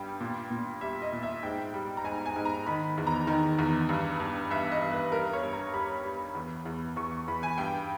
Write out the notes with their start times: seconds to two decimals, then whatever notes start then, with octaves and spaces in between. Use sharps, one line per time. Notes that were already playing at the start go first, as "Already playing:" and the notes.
Already playing: G2 G3 G5
0.20 A#2
0.50 A#2
0.81 G3 E5
1.02 D#5
1.13 A#2
1.23 E5
1.43 G#2 G5
1.74 G3
1.97 A#5
2.04 G#2 G#5
2.26 G#5
2.36 G#2
2.45 A#5
2.66 D#3 B5
2.98 E2
3.07 A#5
3.27 D#3
3.59 E2
3.89 G2
4.20 G2
4.51 G2 E5
4.71 D#5
4.82 G2
4.91 B4
5.12 G3 A#4
5.33 C#5
5.44 G2
5.53 A#5
5.73 G3 B5
6.04 G3
6.35 E2
6.65 E2
6.96 E2 C#6
7.12 C#6
7.28 E2 B5
7.43 G#5
7.58 G2 G5